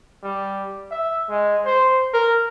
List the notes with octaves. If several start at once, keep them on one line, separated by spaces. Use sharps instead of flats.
G3
E5
G#3
C5
A#4